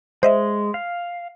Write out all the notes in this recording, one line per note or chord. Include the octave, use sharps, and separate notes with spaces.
G#3 C5 D#5 E5
F5